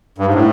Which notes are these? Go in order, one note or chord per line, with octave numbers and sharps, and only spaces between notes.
G2
G#2
A2